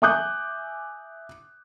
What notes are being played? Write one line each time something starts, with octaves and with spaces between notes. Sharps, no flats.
E5 G#5 D6 D#6 F#6 G6